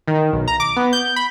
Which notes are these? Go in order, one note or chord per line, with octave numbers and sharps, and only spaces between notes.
D#3
B1
A#5
D6
B3
G6
B5